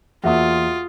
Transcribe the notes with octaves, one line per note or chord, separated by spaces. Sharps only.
E2 A#3 F4 F#4 E5 D#6